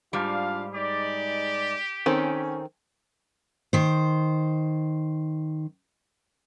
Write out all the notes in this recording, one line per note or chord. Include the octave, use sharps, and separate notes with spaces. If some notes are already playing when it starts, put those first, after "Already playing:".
G#2 G3 D4 F4 F5
G#3 D#4 G4 D5
D#3 C4 C#4 A4 G#5
D#3 C5